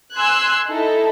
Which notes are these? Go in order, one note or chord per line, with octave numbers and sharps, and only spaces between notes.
G#5 C6 E6 F#6 G#6
D#4 E4 A4